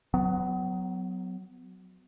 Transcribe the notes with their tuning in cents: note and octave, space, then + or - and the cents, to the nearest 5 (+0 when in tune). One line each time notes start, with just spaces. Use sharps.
F#3 +0 B3 +30